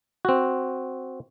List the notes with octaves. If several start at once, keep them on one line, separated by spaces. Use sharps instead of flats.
C4 F#4